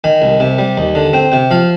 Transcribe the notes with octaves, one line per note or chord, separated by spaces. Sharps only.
D#3 G#5
C2
C3
G3
D#2
D3
C4 G5
C3 G5
F3 F5